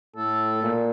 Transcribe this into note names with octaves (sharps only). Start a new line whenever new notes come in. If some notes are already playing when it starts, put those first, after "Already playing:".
A2 A4
A#2